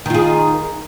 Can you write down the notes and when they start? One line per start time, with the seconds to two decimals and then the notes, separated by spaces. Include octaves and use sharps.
0.06 D#3
0.10 F4
0.14 G#4